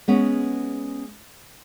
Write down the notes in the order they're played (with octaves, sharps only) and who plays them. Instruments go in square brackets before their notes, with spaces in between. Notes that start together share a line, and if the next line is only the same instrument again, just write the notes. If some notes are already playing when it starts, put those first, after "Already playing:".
[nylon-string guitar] G#3 B3 C#4